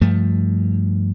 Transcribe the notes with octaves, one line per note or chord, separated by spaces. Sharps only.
G2 F3 A3